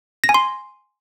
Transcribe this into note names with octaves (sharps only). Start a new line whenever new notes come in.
A#6
G#5
C6